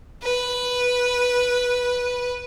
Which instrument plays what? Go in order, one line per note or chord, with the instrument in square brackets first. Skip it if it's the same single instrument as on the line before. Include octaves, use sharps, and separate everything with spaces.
[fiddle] B4